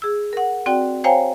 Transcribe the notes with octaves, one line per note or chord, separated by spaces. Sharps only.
G#4 E6
A#4 F#5
C4 F#4 D5 G5
C5 C#5 F5 G5 G#5 A#5